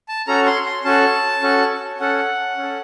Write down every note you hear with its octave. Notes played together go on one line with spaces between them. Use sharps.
A5
C#4 F#4 A4 A#5
C6
C6
C#4 F#4 A4 A5
C#4 F#4 A4
C#4 A4 F#5
C#4
A4